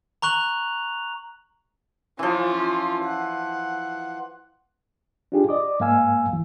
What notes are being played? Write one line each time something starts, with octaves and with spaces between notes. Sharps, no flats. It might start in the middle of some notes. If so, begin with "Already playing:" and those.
A#5 C#6 F#6 F7 F#7
E3 F3 C#4 F4
F#5
D4 D#4 F4 G4 G#4
D5 D#5 D6
G#2 A#3 F5 G#5 E6
C#2 E3